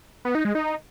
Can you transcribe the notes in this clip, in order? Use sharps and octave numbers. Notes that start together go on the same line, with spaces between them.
B3
D#4
G#3
D#4